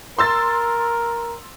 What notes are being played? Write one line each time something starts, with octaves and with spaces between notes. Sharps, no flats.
A#4 C6 E6 A6